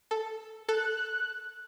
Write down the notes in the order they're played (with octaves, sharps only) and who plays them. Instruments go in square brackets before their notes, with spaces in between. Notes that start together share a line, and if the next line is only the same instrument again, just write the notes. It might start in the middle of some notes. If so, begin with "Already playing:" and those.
[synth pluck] A4
[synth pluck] A4 [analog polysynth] F#6